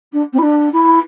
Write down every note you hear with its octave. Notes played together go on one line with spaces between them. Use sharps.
D4
C4
E4
D4
E4